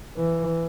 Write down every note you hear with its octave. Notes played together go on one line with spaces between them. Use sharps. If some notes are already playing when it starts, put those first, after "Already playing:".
E3